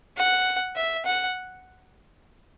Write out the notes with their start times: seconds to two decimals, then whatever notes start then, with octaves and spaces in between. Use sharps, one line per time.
0.17 F#5
0.76 E5
1.05 F#5